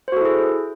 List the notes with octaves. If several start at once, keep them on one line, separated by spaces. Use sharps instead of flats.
E4 F#4 G#4 A4 C5